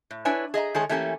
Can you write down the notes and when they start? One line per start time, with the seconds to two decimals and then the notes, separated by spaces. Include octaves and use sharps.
0.11 A2
0.25 D4 E4 B4 C#5 G#5
0.54 G#4 D#5 E5 A#5
0.74 D#3 G#3 A3 G#4 A4 C#5
0.89 E3 A3 A#3 C#4 G4 G#5